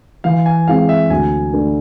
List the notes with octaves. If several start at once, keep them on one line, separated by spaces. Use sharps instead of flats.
E3 F5
G#5
G#3 C4 E4 F5
E5
D2 G#5
D3 A3